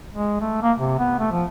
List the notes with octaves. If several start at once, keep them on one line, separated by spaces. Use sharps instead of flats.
G#3
A3
A#3
C3
B3
A3
F3